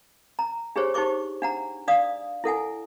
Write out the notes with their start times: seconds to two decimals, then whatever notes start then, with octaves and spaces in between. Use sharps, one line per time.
0.39 A#5
0.76 D4 G4 G#4 C5 C#5
0.94 D#4 G4 C5 C#6 D6
1.42 D4 F#5 A#5
1.88 D4 D5 F5 D#6
2.44 E4 A4 F#5 G#5